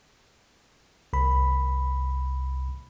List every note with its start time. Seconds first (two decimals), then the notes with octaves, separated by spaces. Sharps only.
1.13 C2 B5